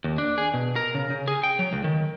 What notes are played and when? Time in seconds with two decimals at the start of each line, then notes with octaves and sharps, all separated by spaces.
0.04 D#2
0.18 D4
0.38 G#4
0.54 B2
0.76 A#4
0.95 C#3
1.10 C#3
1.28 G#4
1.43 G5
1.59 F#3
1.73 C#2
1.84 D#3